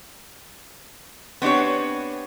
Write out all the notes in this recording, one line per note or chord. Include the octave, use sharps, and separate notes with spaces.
B3 C4 D4 G4 C#5